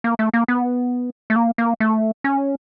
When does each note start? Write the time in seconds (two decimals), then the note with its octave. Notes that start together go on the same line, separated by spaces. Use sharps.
0.04 A#3
0.19 A3
0.34 A#3
0.48 B3
1.30 A3
1.36 A#3
1.58 A#3
1.80 A3
2.24 C#4